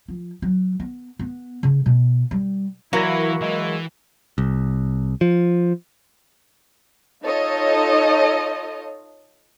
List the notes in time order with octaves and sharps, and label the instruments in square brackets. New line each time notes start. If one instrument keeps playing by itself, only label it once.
[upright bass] F3
F#3
B3
B3
C#3
B2
G3
[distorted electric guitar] E3 [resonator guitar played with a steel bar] F#3 [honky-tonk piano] A#3 A#6 [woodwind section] E4
[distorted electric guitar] E3 [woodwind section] G#3 E4
[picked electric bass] C2
F3
[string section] D#4 F4 A4 C#5 D#5